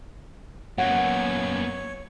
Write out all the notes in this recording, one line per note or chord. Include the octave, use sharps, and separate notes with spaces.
F#2 A#2 A#3 B3 C#5 F#5